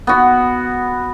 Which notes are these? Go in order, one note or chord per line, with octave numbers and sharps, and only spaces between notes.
B3 F#4